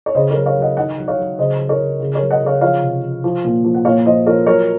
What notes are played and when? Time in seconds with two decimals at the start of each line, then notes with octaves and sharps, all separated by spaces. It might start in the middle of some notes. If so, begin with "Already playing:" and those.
0.06 C#5
0.15 C#3 C5 D#5
0.31 A#4 C#5
0.35 F#3
0.46 C#5 F5
0.57 F#3
0.62 D#5 F#5
0.77 D#3 D#5 F#5
0.98 F#3
1.08 C#5 F5
1.18 F#3
1.38 C#3 C5 D#5
1.59 F#3
1.69 A#4 C#5
1.79 C#3
2.00 C#3
2.15 A#4 C#5
2.21 F#3
2.31 D#5 F#5
2.42 C#3 C#5 F5
2.61 F3 C#5 F5
2.82 C3
3.02 F3
3.24 F3
3.44 A#2
3.64 F3
3.75 F#5
3.85 A#2 C#5 F5
4.06 F3 C5 D#5
4.26 F3 A#4 C#5
4.47 F#3 A#4 C#5